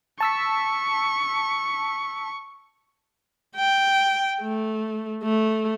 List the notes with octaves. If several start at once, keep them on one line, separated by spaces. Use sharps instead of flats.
A5 C#6 E6 B6
G5
A3
A3